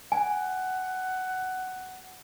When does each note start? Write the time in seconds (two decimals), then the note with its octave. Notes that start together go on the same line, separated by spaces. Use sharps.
0.12 F#5 G#5